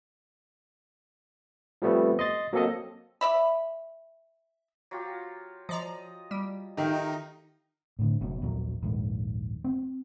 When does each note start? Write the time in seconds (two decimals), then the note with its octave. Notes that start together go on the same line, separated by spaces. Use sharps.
1.82 F3 G3 A3 B3 C4
2.19 D#5 C6 A6
2.53 F#3 A#3 C4 A4 D#5
3.21 D5 E5 B5
4.91 F#3 F4 G4
5.69 F3 D5 D#5 A#5
6.31 G3
6.77 D#3 A3 D#4 G4 F5
7.99 A2 D3
8.21 F#1 F#2 B2
8.42 A#1 D#2 F#3
8.82 A#1 D#2 G#2
9.64 C4